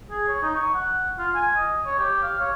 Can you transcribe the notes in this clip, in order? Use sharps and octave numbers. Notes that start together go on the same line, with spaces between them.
G#4
C#5
D#4
C#6
F#5
F4
G#5
D#5
C#5
G4
F5
C#5